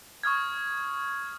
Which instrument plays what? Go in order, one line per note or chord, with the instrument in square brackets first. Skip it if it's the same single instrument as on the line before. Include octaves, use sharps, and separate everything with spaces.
[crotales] C#6 D#6 F6 G#6